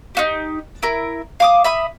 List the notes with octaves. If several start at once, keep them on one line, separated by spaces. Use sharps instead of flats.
D#4 F#4 G4
E4 A#4
F5 D6 D#6
E5 B5 D#6